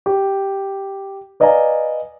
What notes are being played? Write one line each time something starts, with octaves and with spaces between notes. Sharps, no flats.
G4
B4 D5 D#5 F5 G#5 A#5